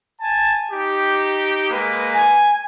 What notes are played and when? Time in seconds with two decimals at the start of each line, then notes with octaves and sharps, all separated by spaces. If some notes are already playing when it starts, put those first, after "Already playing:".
0.20 G#5 A5
0.70 D#4 G4
1.70 G#3 A#3 B4
2.14 G#5